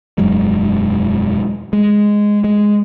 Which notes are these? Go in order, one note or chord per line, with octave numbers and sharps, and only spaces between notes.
E1 F#2 F#3 G#3
G#3
G#3